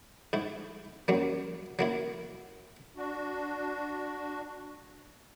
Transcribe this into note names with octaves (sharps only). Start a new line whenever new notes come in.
G#2 E4
F#2 F#3 A#3
F#3 A#3 E4
D4 F#4